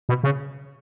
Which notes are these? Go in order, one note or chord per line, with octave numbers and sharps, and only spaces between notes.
B2
C#3